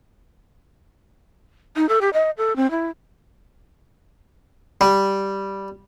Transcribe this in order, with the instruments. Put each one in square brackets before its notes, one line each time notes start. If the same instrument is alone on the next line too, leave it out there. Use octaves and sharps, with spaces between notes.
[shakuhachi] D#4
A4
G4
D#5
A4
C4
E4
[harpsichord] G3